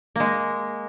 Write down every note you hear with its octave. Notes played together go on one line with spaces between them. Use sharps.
G#3 A#3